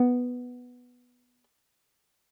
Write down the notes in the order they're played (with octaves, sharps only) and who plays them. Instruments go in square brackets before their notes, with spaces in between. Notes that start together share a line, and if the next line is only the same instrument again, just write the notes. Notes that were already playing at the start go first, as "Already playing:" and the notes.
Already playing: [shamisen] B3